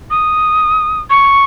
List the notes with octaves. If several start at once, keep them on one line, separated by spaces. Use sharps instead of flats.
D#6
C#6